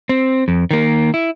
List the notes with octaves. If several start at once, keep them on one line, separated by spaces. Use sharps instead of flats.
C4
F2
D#3 A#3
E4